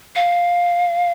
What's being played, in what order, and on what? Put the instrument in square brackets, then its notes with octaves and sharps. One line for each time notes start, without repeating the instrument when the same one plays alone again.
[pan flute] F5